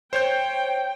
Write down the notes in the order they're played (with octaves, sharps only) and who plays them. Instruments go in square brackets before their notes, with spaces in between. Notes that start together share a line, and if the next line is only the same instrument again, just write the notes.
[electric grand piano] C5 C#5 G6 [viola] G5